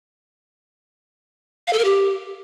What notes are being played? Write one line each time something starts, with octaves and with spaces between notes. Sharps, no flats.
F5
A4
A#4
G4